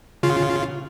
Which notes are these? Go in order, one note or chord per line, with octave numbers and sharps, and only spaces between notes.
C#3 F4